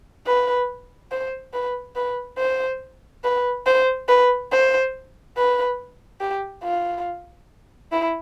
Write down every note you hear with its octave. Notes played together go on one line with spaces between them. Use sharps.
B4
C5
B4
B4
C5
B4
C5
B4
C5
B4
G4
F4
E4